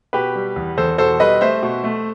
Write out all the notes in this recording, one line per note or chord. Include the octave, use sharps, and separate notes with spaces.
B2 G4 B4
G3
E2
E2 A4 C5
B2 A4 C5
G3 B4 D#5
A3 C5 E5
B2
A3